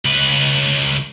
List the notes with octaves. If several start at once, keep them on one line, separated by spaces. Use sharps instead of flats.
C#2 B4